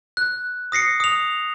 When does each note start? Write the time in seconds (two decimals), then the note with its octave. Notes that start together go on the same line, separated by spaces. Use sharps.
0.17 F#6
0.72 D#6 A#6 C7 C#7
1.00 D#6 F7